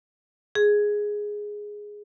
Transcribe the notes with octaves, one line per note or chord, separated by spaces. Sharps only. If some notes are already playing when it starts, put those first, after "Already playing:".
G#4